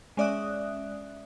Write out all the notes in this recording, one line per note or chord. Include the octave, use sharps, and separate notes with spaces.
G#3 C#4 D5 E5 D#6 F#6